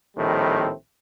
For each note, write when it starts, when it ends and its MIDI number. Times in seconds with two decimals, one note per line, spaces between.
0.17 0.72 34
0.17 0.72 45
0.17 0.72 51
0.17 0.72 55
0.17 0.72 57
0.17 0.72 60